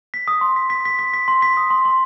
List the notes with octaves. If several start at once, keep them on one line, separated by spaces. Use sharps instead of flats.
B6
D#6
C6
B6
B6
B6
B6
B6
C6
B6
D#6
C6
C6